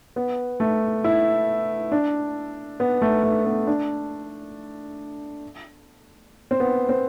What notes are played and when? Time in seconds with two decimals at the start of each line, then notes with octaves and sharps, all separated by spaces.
0.16 B3
0.60 A3
1.04 E4
1.92 D4
2.80 B3
3.02 A3
3.23 A3
3.45 B3
3.67 D4
6.51 C4
6.60 B3
6.89 C4